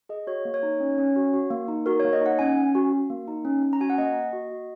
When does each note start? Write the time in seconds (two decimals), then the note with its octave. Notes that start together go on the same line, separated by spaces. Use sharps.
0.09 G#4 D#5
0.27 F#4 C#5
0.45 A#3
0.54 C#5
0.63 D#4
0.80 C#4
0.98 C#4
1.16 F#4
1.34 F#4
1.50 A#3
1.68 D#4
1.86 F#4 A#4
2.00 C#5
2.04 A#3
2.13 D#5
2.21 D#4 F#5
2.39 C#4 G#5
2.57 C#4
2.75 F#4
2.93 F#4
3.10 A#3
3.28 D#4
3.45 C#4
3.63 C#4
3.73 A#5
3.80 F#4 G#5
3.90 F#5
3.98 A#3 D#5
4.16 A#3
4.33 F#4
4.51 F#4